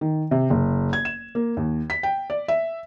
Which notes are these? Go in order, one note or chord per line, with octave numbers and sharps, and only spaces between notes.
D#3
C3
F#1
G#6
E7
A#3
D#2
B6
G5
D5
E5